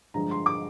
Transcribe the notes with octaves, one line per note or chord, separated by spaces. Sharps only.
G2 D3 F3 G#3 A#5
C6
D6